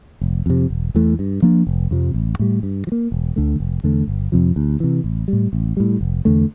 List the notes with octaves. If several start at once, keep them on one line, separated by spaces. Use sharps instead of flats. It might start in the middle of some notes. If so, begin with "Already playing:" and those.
F1
F2 C3
E1
E2 E3 A3
G2
F3 A#3 D4
F1
F2 C3 F3
A1
A2 G3
G2
F3
A#3
E1
D2 D3 A3
F1
E2 D3 A3
G1
F2 C3 F3
D2
C3 E3
A1
G3
A2
A1
A2 G3
F1
E2 D3 A3